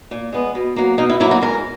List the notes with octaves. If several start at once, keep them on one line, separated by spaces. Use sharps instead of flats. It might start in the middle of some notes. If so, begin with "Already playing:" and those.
A#2
G#3 B3
B2
F#3 A#3
B2 D#4
E4
F#3 A#3 E4
F#4
G#2 A#4